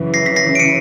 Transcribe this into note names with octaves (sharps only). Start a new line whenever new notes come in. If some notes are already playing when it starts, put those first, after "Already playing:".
Already playing: F#2 C#3 E3
A#6 C7
B6
A#6 C7
D7
C#7 D#7